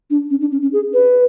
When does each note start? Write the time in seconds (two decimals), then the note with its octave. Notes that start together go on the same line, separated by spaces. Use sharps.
0.10 D4
0.31 C#4
0.41 D4
0.52 C#4
0.62 C#4
0.73 G#4
0.93 B4